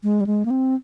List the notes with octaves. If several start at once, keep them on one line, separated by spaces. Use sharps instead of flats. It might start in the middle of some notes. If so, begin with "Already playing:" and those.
G#3
G3
G#3
A#3
C4